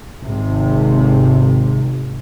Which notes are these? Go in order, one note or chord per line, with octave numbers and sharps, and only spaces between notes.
G#1 C3